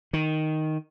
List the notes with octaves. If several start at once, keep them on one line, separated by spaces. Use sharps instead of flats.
D#3